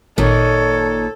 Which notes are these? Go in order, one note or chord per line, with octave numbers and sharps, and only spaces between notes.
G#1 A#2 D#3 A4 C#5